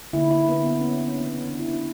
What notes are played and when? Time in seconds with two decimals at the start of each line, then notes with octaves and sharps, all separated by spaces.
0.13 D3 A#3 E4
0.31 E4
0.49 B3
0.66 B3
0.80 C#4
0.93 D4
1.07 C#4
1.20 C#3 E3 A#3 B3
1.33 C#4
1.46 D4
1.60 E4